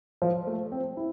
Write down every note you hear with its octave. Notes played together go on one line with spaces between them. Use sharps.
F3
A3
C4
E4